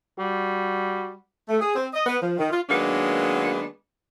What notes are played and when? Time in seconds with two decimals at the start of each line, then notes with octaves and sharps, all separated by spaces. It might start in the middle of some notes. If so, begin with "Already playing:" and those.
0.19 G3 F#4
1.49 A3
1.60 G#4
1.75 C4
1.93 D#5
2.06 B3
2.21 F3
2.38 D#3
2.50 F4
2.70 D#3 F#3 G#3 A#3 B3 D4